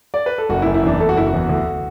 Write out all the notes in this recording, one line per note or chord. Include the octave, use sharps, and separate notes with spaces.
D5
B4
A4
F#1 F#4
E4
F#1
E4
E2 D4
A3 A4
F#4
F#1 E4
F#4
E2
D2